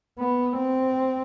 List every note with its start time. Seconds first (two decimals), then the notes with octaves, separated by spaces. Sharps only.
0.19 B3
0.57 C4